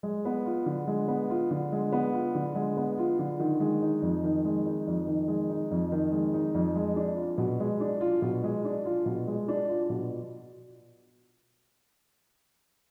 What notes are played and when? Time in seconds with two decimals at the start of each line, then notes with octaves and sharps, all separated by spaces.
0.03 G#3
0.25 B3
0.46 F4
0.66 D3
0.87 G#3
1.08 B3
1.30 F4
1.51 D3
1.72 G#3
1.92 B3
2.14 F4
2.35 D3
2.55 G#3
2.77 B3
2.98 F4
3.19 D3
3.40 D#3
3.60 G#3
3.82 D#4
4.02 F2
4.24 D#3
4.45 G#3
4.66 D#4
4.87 F2
5.07 D#3
5.28 G#3
5.49 D#4
5.71 F2
5.92 D#3
6.12 G#3
6.34 D#4
6.54 F2
6.75 G#3
6.96 D4
7.17 F4
7.38 B2
7.60 G#3
7.80 D4
8.01 F4
8.22 B2
8.44 G#3
8.65 D4
8.86 F4
9.06 B2
9.27 G#3
9.48 D4
9.69 F4
9.90 B2